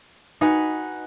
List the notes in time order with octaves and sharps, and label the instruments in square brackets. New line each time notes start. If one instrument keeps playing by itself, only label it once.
[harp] D#4 F#4 B4 F#5 G#5